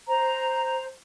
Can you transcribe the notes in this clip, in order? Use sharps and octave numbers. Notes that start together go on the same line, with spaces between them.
C5 A#5